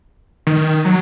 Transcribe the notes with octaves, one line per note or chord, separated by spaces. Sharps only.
D#3
F#3